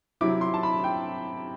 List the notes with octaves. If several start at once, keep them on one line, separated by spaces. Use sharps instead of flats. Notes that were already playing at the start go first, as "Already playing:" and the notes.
C3 F#3 C4 E4 D6
C6
A5
B5
G5